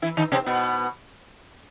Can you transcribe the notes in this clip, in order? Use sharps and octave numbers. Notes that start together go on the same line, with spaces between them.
E3 E4
D#3 D#4
C3 C4
B2 B3